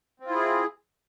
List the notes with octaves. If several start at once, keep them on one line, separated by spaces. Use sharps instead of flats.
C4 E4 F4 G#4